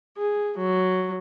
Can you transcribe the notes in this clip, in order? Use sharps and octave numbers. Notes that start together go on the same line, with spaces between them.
G#4
F#3